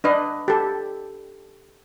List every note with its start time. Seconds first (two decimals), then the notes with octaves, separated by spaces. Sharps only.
0.04 D4 B4 D#5
0.48 G4 A4